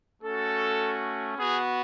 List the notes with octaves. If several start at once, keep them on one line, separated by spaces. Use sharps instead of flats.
A3 C#4 F#4 A4
B3 F#4 G#4